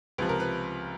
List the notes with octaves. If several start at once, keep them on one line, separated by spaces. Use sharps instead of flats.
C#2 C3 F3 B4
A#4
B4